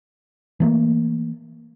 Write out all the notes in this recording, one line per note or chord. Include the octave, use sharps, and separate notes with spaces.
E3 A3 A#3